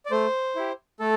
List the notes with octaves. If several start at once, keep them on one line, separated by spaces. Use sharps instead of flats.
D5
A3 C5
E4 G4
A3 A4